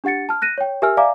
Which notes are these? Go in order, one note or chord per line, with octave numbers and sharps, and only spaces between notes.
D4 G4 F#5 A6 C#7
A5 F6
F#6 A#6 D#7
C#5 G5
G4 A#4 E5 G#5 E6 F6
D5 E5 F5 G#5 A#5 D6